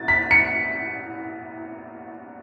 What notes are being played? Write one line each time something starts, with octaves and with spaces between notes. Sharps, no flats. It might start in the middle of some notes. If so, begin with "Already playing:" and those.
Already playing: A6
B6
C#7